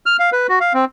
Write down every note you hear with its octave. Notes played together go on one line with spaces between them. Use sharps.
F6
F5
B4
F#4
F5
C4